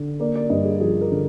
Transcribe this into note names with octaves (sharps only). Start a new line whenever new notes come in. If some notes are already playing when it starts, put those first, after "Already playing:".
Already playing: D3
A#3 D5
D5
G2 D#5
G#4
F3 G#4
A#4
D3